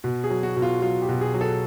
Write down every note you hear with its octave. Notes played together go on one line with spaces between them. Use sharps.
B2
G#4
F#3
F#4
B2
F4
F#3 F4
G4
B2
G#4
F#3
A4